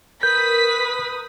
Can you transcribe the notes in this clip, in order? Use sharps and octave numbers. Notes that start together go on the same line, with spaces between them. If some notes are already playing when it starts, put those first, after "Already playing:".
A#4 B4 D#6 G6 B6